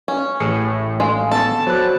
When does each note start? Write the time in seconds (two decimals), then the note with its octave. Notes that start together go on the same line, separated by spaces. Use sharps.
0.08 C#4
0.40 A1 A2 G#4 C#7
1.00 G#3 F5
1.31 B3 A4 A5
1.67 F#3 B4 C5 D5 F#6